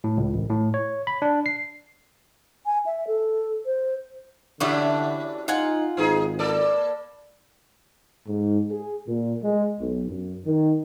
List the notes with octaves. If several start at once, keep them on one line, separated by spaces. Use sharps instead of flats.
A2
C#2
A1
A2
C#5
B5
D4
C7
G#5
E5
A4
C5
D3 E3 C#4 D4 E4 F#4 G4
D#4 F4 F#5 G#5
G#1 B3 D#4 G#4
A#3 A4 D5
G#2
G#4
A#2
G#3
B1
F#2
D#3